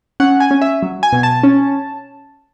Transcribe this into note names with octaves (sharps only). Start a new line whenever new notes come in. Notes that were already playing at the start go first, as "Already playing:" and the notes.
C#4 F#5
G#5
C#4
E5
F#3
G#5
B2
A5
C#4